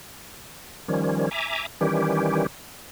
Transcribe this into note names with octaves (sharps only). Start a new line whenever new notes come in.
D#3 F3 G3 C#4
E5 G#5 A#5 D6
D#3 E3 G3 C#4 G4